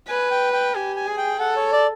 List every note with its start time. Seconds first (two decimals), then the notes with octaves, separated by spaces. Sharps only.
0.08 B4 G#5
0.31 G5
0.53 G5
0.75 G4 G#5
0.96 G#5
1.07 G#4
1.17 G5
1.39 A4 F#5
1.56 C#5
1.72 D5